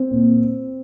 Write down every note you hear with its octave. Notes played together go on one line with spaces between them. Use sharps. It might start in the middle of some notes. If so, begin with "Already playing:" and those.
Already playing: C4
A#2